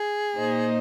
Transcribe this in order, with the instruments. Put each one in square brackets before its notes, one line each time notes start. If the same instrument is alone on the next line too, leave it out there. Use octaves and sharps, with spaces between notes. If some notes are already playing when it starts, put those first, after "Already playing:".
Already playing: [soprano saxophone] G#4
[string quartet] A#2 A#3 D#4 C5 D#5